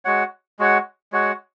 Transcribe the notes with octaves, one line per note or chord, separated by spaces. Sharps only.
G#3 F#4 C#5 F#5
G#3 F#4 C#5 F#5
G#3 F#4 C#5 F#5